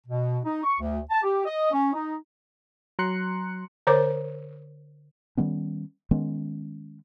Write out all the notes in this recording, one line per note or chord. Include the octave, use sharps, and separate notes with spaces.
B2
D#4
C#6
D2
A5
G4
D#5
C#4
D#4
F#3 A#5 C6 F#6 C#7
D3 A#4 C5 C#5 D6
D#3 G3 B3 C#4
D#3 G#3 B3 C#4